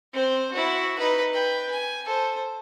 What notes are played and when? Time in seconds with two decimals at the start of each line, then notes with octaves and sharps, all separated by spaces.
0.13 C4 C5
0.52 E4 F#4
0.98 D#4 B4
1.33 B4 G5
1.70 G#5
2.06 A4 C5